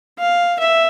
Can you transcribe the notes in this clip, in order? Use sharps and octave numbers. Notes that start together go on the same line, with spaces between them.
F5
E5